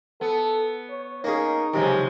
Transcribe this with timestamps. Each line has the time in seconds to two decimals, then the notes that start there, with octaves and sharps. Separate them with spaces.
0.21 B3 A4
0.90 C#5
1.24 A#3 C#4 D#4 G#4
1.73 C#2 F#2 C3 D#3 F3 G#3